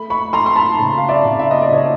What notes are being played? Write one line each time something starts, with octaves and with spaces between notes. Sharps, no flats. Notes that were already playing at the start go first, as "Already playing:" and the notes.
Already playing: A3 B5
B5 C#6
A3 A#5 C6
C6
A5 B5
C#3
F5
D5 E5
C#3
E5
D#5
D5
C#3 C#5 D#5